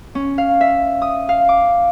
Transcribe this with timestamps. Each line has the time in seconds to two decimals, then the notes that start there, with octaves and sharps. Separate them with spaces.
0.15 C#4
0.38 F5
0.61 E5
1.02 D#6
1.29 F5
1.49 D6